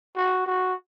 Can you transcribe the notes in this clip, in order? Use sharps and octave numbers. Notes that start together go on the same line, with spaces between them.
F#4
F#4